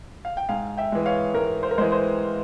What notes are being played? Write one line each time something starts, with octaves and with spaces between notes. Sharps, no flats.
F5
G5
G#2 F5 G#5
E5 G5
E3 G#3
C#5 F5
G#2 A#4
C5
A#4
E3 G#3 C5
C5